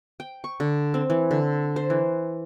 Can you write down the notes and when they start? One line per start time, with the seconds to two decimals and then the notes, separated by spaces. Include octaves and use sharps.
0.20 G5
0.44 C#6
0.60 D3
0.94 C4
1.10 E3
1.31 D3
1.76 C5
1.90 E3